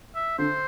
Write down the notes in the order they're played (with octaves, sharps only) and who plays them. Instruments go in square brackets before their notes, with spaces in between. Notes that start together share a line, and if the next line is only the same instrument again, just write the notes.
[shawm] E5
[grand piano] D3 [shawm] C5